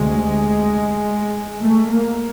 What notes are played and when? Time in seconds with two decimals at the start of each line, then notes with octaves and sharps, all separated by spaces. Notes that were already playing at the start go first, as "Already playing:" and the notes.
Already playing: D2 C3 G#3
1.59 A3
1.90 A#3